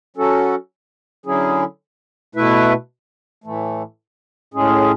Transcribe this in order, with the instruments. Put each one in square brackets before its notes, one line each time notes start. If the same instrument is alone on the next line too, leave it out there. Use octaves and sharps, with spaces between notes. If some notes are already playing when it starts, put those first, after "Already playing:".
[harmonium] F#3 C#4 F#4 A4
D3 F#3 C#4 E4 G#4
B2 A3 E4 B4 E5
A2 E3 A3
A2 G#3 C#4 G#4